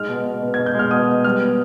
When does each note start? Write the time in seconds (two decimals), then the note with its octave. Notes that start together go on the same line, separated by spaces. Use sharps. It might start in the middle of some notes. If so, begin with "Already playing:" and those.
Already playing: G#2 G#3 F6
0.09 B2
0.25 B2
0.42 B3
0.54 B2 G#6
0.66 G6
0.75 G#3 F6
0.91 B2 D#6
1.08 B3
1.24 G3 F6
1.41 B3